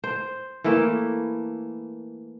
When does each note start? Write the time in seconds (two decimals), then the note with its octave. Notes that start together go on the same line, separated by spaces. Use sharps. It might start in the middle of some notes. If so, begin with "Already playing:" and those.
0.04 C5
0.64 E3 A3 A#3 E4